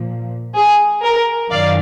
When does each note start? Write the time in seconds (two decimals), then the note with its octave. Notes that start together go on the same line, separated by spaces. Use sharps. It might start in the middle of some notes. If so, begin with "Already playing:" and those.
Already playing: A#2 F3
0.55 G#4
1.03 A#4
1.50 F#2 D#3 D5 F5